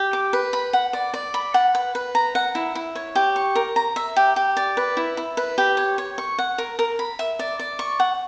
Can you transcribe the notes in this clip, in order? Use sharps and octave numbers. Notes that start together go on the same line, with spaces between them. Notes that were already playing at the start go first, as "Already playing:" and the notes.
Already playing: G4
D6
B4
B5
F#5
D5
D5
B5
F#5
B4
B4
A#5
F#5
E4
E4
C#5
G4
C#6
A#4
A#5
E5
G4
G4
D5
B4
E4
E4
B4
G4
C#5
C#5
C#6
F#5
A#4
A#4
B5
E5
D5
D5
C#6
F#5